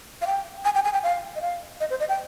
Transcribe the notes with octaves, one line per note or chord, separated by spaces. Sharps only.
F5
G5
G#5
G5
G#5
G5
F5
D#5
F5
D#5
C5
D#5
G5